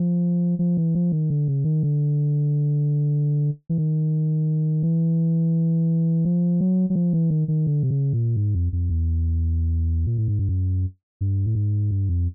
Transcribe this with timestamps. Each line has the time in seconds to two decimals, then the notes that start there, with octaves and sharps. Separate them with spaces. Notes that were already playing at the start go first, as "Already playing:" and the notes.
Already playing: F3
0.59 F3
0.77 E3
0.95 F3
1.12 D#3
1.30 D3
1.48 C#3
1.64 D#3
1.83 D3
3.69 E3
3.78 D#3
4.83 E3
6.25 F3
6.61 F#3
6.90 F#3
6.95 F3
7.13 E3
7.30 D#3
7.48 D#3
7.67 D3
7.83 C3
7.91 C#3
8.13 A#2
8.36 G#2
8.55 F2
8.73 F2
8.90 E2
10.06 A#2
10.17 A2
10.28 G#2
10.39 G2
10.49 F#2
11.21 G2
11.46 A2
11.55 G#2
11.91 G2
12.09 F2